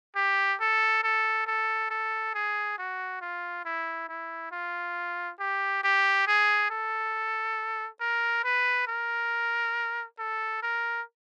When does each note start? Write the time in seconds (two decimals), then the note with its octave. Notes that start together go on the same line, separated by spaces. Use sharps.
0.16 G4
0.61 A4
1.04 A4
1.47 A4
1.90 A4
2.35 G#4
2.79 F#4
3.21 F4
3.65 E4
4.09 E4
4.52 F4
5.40 G4
5.84 G4
6.27 G#4
6.70 A4
8.01 A#4
8.44 B4
8.88 A#4
10.19 A4
10.63 A#4